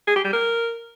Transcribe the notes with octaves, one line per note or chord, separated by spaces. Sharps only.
G#4
G4
G3
A#4